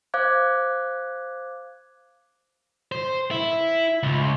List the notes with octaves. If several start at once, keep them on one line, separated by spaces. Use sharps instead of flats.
C5 F5 D6 F#6 G#6
C5
E4
C#2